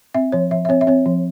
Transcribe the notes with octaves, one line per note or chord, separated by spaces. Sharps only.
C4 E5
F3 C#5
F3 E5
E5
C4 C#5
E5
C4 C#5
F3